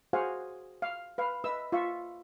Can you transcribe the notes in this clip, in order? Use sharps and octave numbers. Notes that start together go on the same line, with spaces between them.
F#4 G#4 C5 F5 F#5 G#5
F5
B4 F5
B4 D#5 E5 E6
F4 E5 C#6